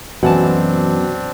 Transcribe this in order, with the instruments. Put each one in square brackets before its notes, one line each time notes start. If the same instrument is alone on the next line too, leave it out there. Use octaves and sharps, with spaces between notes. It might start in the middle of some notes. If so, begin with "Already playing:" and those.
[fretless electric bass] F#2 B2 [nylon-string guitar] E3 A3 A5 [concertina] C4 D4 [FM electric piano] F#4